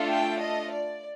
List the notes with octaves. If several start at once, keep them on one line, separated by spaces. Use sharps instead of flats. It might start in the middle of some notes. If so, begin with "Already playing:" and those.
Already playing: A3 D4 F4 A4
G5
D#5
D5